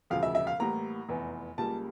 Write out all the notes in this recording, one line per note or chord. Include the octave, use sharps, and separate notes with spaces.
E1 D2 C#3 F3 F5
E5
E5
F5
A1 A2 G3 A#3 A#5
F1 E2 E3
C#2 C#3 G3 A#3 A5